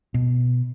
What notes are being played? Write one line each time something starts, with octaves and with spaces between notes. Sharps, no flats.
B2